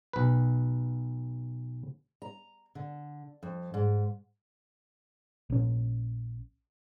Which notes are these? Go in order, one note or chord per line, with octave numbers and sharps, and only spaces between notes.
B1 B4
A#5
D3
F2
G#2
A#1 C#4